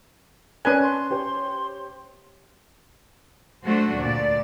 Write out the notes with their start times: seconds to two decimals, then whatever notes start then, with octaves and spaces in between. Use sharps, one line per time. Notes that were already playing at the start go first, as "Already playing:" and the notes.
0.65 C#4 A#4 B4 D5 G#5 A5 F#6
0.83 C6
1.11 G4 C5 C#5
3.65 F#3 A3 D4 F#4 C5
3.96 D2 A#2 D5